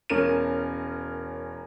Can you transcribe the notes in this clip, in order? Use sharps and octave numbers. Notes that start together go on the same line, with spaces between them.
E1 C#4 A#4 D#7